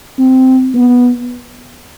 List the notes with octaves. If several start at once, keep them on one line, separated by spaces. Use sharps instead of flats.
C4
B3